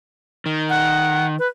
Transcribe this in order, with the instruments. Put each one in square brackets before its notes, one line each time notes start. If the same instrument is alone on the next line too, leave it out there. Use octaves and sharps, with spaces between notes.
[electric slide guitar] D#3
[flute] F#5
B4